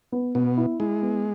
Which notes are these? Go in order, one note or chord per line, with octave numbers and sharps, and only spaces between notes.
B3
B2 B3
E4
G#3 E4
B3